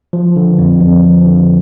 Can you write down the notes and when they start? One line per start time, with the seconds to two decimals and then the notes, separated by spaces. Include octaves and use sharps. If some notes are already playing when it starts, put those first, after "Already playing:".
0.13 F3
0.36 D3
0.59 F2
0.81 F2
1.03 F3
1.26 D3